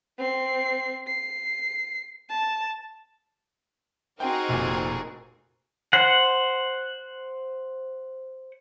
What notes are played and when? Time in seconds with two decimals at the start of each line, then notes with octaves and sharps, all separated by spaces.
0.18 C4 C7
1.07 C7
2.30 A5
4.20 C4 D#4 F#4 G#4 A#4 G5
4.49 F1 A#2
5.93 C5 F#5